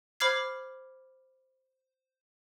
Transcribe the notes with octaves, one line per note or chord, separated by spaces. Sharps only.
C5 B5 D6 F6 G#6 C7